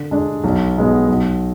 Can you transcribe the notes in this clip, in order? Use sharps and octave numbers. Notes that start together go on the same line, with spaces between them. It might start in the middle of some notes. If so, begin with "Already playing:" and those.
Already playing: D3
G#3 D4
B1
B2 G#3 B3
B1